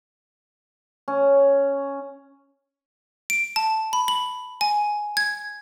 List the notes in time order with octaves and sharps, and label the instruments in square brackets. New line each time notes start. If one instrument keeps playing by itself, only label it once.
[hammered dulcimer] C#4
[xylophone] D7
A5
B5
F#7
G#5
G#6